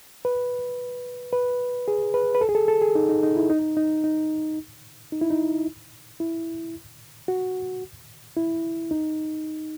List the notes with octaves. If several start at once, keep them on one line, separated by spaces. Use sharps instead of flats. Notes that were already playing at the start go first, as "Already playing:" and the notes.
B4
B4
G#4
B4
B4
A4
G#4
A4
A4
G#4
D#4
D#4
D#4
E4
D#4
D#4
D#4
D#4
E4
D#4
E4
F#4
E4
D#4